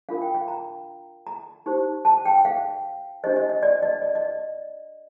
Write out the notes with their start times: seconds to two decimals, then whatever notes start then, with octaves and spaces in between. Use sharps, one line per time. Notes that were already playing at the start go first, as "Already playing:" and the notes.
0.09 D4 F4 A#4 F5
0.22 G5
0.35 F5
0.48 A#5
1.27 A#5
1.66 D#4 G4 C5
2.05 A5
2.25 G5
2.45 F5
3.24 D4 G4 C5 D#5
3.36 D#5
3.50 D#5
3.63 D5
3.83 D#5
4.02 D5
4.15 D#5